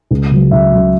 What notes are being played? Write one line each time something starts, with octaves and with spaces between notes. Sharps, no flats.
C#2
C#3 F#3
C#2 E5
C#3 F#3